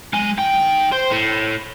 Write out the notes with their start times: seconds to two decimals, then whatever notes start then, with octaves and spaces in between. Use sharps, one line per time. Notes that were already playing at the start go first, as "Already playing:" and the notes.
0.14 G#3 G#5
0.39 D#3 G5
0.92 C5
1.11 A2